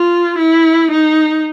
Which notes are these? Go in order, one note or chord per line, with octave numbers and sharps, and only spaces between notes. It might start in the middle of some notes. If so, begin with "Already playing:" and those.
Already playing: F4
E4
D#4